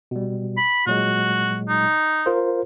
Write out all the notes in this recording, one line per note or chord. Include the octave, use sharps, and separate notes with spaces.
B2 G3
B5
A#2 F#3 G#3 F#4
D#4
F4 A#4 C5